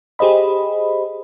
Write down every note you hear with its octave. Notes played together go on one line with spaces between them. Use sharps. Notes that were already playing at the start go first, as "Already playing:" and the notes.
G4 G#4 C5 D#5 B5